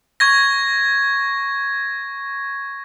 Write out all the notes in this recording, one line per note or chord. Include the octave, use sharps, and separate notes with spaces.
C#6 G#6 A#6